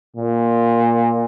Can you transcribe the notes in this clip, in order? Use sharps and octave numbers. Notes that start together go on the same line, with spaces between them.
A#2